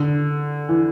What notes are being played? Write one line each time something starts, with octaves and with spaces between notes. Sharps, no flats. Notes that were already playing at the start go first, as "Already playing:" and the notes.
Already playing: D3
E3